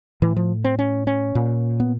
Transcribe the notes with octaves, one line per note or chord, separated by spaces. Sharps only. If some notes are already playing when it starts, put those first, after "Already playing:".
A2 E3
F3
C4
C#4
C#4
A#2
B3